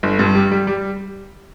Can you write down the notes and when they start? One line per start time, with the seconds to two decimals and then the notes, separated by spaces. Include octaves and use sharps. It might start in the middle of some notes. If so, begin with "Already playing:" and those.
0.03 G1
0.19 G2
0.35 G3
0.52 G3
0.67 G3